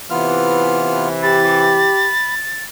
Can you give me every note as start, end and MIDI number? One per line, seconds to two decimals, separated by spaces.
0.10 1.89 48
0.10 1.89 52
0.10 1.08 59
0.10 1.08 65
0.10 1.08 89
1.23 2.13 67
1.23 2.34 83
1.23 2.64 93